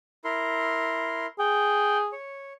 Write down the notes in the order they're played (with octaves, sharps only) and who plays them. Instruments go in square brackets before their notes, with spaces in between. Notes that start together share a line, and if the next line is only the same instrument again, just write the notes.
[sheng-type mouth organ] E4 A#4 C6
[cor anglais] G#4 [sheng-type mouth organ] G5
[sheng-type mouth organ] C#5